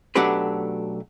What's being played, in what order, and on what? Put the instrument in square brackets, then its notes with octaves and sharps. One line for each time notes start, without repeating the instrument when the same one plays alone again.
[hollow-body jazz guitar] B1 F#3 A3 D4 G4 B4